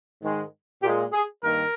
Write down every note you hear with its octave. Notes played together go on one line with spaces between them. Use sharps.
G#2 D#3 G#3
A#2 G#3 G4
G#4
G2 D#3 A#3 A#4